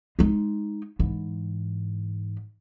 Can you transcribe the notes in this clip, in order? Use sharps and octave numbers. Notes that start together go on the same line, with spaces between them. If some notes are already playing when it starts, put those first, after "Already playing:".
G#3 D#4
G#2 E3